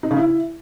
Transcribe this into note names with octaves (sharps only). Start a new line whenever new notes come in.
D#4
C#3
E4